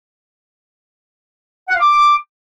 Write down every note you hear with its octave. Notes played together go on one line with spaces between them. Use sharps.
F#5
F5
D6